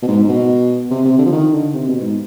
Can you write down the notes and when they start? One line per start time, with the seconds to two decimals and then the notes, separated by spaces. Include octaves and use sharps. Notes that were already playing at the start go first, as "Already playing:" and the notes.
0.02 B2
0.08 G#2
0.24 G#2
0.29 B2
0.90 C3
1.04 C3
1.18 D3
1.26 F3
1.32 D#3
1.53 D3
1.74 C3
1.87 B2
2.01 G#2